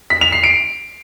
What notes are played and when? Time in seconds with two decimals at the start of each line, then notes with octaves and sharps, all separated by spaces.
0.10 B6
0.21 F7
0.32 C7
0.44 D7